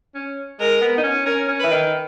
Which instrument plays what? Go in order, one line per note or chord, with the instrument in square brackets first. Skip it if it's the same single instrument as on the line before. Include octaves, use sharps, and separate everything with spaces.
[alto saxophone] C#4
[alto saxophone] G#3 [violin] A#4
[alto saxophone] B3
D#4
C#4
[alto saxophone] C#4 [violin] A#4
[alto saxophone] C#4
[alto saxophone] E3 [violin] B4
[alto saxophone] D#3